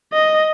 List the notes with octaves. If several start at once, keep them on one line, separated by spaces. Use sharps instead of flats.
D#5